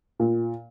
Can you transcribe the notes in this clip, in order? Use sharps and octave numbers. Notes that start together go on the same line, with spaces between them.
A#2